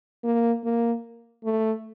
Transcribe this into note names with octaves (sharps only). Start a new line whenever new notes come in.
A#3
A#3
A3